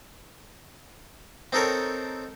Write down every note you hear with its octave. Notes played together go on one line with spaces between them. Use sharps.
C4 D#4 A4 A#4 C#5